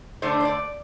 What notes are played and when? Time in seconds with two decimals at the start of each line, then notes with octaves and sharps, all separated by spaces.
0.22 D3 A3 D4 C5
0.40 C5
0.45 D5